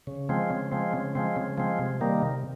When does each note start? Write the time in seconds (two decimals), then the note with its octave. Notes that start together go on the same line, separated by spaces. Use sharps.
0.07 C#3
0.29 F3 G#3 C4
0.50 C#3
0.72 F3 G#3 C4
0.93 C#3
1.15 F3 G#3 C4
1.36 C#3
1.58 F3 G#3 C4
1.79 C3
2.01 D#3 G3 A#3
2.22 C3